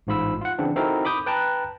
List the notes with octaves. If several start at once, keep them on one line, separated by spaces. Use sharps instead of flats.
A1 G#2 F4 B5 E6
F4 F#5
C#3 E3 C4 D4
C4 D#4 E4 F#4 A4 A#4
B5 D6 D#6 G6
B4 G5 A5 A#5 F#6